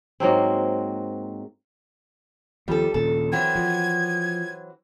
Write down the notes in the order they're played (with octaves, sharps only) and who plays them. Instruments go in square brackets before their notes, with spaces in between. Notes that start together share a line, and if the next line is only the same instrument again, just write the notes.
[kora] G#2 F#3 A#3 C4
[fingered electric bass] D#2 F3 [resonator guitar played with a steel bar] G3 A4
[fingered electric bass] D#2 A#2 C#3 [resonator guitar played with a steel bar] A4
[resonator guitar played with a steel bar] E3 F#3 C4 [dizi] G#6
[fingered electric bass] F3